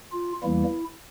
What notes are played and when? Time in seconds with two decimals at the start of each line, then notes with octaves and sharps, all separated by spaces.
0.13 F4
0.43 E2 E3 G3 A#3 E4